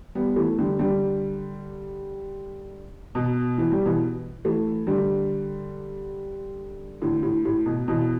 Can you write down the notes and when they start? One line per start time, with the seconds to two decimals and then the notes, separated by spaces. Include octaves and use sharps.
0.15 G3 B3
0.36 E3 A3
0.59 D3 G3
0.79 D3 G3
3.15 B2
3.58 E3
3.72 G3
3.85 B2 E3
4.45 E3 A3
4.87 D3 G3
7.02 A2 D3
7.23 A2
7.45 A2
7.66 B2
7.88 B2 E3